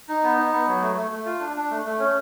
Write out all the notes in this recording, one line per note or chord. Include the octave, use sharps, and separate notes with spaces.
D#4
B3
D#4
B3
F#3
A3
A3
A3
F4
D4
D4
A3
A3
C#4